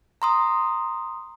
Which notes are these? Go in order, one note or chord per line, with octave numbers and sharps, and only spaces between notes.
A#5 C6 D#6